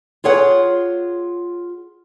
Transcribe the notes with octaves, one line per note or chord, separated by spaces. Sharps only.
F4 G#4 C#5 F#5